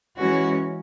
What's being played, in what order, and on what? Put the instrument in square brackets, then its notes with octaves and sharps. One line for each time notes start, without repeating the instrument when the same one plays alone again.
[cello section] E3 G#3 C#4 F#4